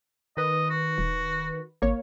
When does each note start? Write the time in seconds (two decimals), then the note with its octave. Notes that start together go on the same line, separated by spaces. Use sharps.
0.37 D#3 B4 D#5
0.70 F#4
0.98 D#1
1.82 G#1 A#3 C#5